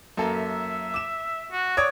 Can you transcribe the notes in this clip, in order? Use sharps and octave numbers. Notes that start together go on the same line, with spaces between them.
F#2 A#3 A4
E5
D6 E7
F#4
C#5 D5 D#6 G#6